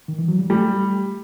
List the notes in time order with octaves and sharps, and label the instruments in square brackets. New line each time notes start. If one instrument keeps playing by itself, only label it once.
[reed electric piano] D#3
E3
F#3
G3
[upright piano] G3 [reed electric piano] A3